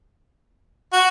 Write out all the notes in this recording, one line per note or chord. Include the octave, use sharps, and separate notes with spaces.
F#4